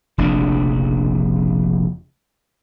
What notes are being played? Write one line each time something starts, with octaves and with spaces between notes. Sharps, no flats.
F1 A#1 C#3 D4